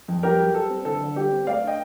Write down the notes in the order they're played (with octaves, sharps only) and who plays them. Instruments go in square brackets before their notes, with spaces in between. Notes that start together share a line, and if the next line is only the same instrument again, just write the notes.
[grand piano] F2
G3 G4 A#4
G3
G3 A4
C4
D3 A4
D3
G3 G4
C4
A3 D5 F5
D4 D#5 G5